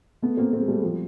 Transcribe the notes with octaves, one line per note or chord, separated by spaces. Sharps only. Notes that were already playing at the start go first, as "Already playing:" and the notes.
A3 B3
A#3 C4
A#3 C4
G#3
G3 A3
F3 G3